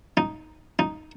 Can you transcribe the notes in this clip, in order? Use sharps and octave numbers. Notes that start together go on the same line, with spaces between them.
D#4
D#4